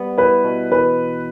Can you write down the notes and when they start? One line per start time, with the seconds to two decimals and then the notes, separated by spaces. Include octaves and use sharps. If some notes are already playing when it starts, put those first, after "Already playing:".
Already playing: G3 B3
0.17 E4 B4
0.44 B2
0.71 E3 B4